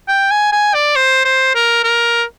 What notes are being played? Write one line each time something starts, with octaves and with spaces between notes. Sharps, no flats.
G5
G#5
G#5
D5
C5
C5
A#4
A#4